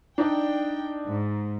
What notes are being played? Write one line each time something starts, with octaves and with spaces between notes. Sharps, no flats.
D4 D#4 D5 G5
G#2